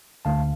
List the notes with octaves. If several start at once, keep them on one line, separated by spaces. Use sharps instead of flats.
D2 D3 A3 F5 A5